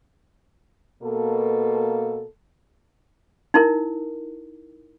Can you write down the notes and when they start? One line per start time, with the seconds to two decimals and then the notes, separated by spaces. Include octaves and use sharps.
1.03 B2 A#3 A4
3.54 D#4 E4 A#4